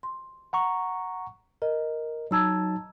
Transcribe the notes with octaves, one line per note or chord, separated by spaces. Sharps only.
C6
F#5 A#5 C#6
A#4 D#5
F#3 D#4 A5 A#5 E6 G#6